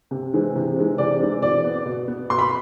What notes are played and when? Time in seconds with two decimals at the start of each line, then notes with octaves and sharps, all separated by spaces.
0.11 C3
0.33 E3 G#3 C4
0.56 C3
0.77 E3 G#3 C4
0.98 C3 D5
1.20 E3 G#3 C4
1.42 B2 D5
1.64 B3
1.86 B2
2.08 B3
2.30 B2 C6
2.39 B5